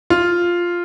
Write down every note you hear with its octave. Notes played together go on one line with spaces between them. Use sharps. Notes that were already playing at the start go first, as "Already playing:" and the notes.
F4